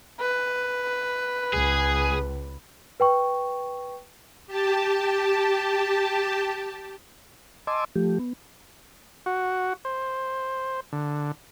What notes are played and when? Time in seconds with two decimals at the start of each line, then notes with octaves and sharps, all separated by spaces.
0.20 B4
1.53 C#2 G#4
3.00 B4 G5 C#6
4.47 G4 A5
7.67 D#5 G#5 A5 C6 D6 E6
7.96 F3 A3 G4
8.19 B3
9.26 F#4
9.85 C5
10.93 D3